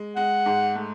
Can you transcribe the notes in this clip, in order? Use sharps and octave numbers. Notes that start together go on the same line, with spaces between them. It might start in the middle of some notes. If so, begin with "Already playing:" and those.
Already playing: G#3
G#3 F#5
G#2
A3